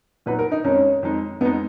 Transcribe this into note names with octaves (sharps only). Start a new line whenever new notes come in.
A#2 F#3 B3 D#4 B4
A#4
D#4
F2 D#3 G#3 C#4 D#4
F2 D#3 G#3 D#4
F2 D#3 G#3 B3 D#4